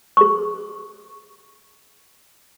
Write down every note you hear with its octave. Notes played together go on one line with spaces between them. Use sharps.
G#4 C#6